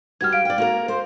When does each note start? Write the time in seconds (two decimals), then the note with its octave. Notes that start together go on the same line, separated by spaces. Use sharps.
0.21 G2 F#4 G4 F6 G#6
0.33 F5 D7
0.45 D5 G5
0.58 A#3 F#4 A#4
0.88 C5